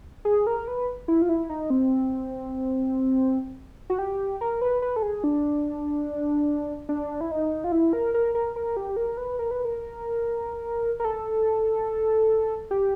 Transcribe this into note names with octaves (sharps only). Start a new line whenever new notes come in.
G#4
A#4
B4
E4
F4
E4
D#4
C4
F#4
G4
A#4
B4
B4
A4
G#4
D4
D4
E4
D#4
F4
E4
A#4
A#4
A#4
A#4
G4
A#4
B4
A#4
B4
A#4
A#4
A4
G4